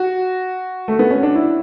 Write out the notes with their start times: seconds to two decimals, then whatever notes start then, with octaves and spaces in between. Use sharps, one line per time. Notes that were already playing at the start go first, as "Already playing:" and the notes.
Already playing: F#4
0.88 A3
0.99 B3
1.11 C#4
1.23 D4
1.35 E4